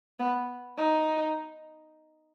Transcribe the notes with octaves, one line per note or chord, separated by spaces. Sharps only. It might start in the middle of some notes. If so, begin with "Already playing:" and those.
B3
D#4